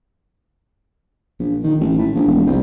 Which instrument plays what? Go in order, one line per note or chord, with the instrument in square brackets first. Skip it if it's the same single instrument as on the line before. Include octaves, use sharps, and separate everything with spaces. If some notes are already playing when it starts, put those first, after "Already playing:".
[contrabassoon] A#1
D#3
A1
A2
A#1
E1
C2